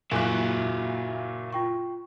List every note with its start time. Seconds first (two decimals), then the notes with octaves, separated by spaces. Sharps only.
0.11 F#1 A#2 F#4 E5 F5 G#5 F#6
1.53 F4 G5 C#6